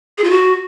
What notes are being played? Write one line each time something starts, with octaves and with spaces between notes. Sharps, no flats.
G#4
F4
F#4